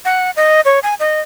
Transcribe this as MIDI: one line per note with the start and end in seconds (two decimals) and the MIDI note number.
0.05 0.31 78
0.36 0.61 75
0.65 0.79 73
0.83 0.94 80
1.00 1.21 75